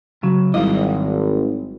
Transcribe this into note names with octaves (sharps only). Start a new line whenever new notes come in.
C#3 F#3
G#1 F#3 G3 E4 D#5